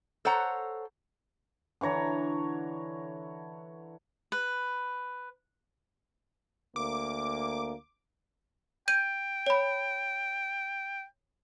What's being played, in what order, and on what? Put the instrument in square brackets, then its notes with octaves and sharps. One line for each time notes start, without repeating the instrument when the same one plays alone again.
[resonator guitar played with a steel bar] A4 C5 C#5 F#5 A#5
[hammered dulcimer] D3 E3 C#5 A#5
[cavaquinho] B4
[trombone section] D2 A#3 [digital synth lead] D6
[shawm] G5 [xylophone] G6 D#7
[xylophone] C#5 B5